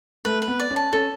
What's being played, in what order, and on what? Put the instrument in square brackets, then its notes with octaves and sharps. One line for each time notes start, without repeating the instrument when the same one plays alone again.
[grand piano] A3 [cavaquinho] B4
[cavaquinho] B4
[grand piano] B3
[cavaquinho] D5
[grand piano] C#4
[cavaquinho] A5
[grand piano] C#4 [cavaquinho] A4